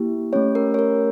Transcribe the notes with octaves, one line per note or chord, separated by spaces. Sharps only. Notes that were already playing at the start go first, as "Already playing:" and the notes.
Already playing: A#3 E4 G4
A3 C#4 G4 C#5
A#4
C#5
A#4